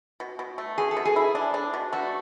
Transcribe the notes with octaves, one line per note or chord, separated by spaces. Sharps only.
B2
B2
A3
B2 G#4
A4
B2
G#4
E4
D4
D4
B2
A3 F#4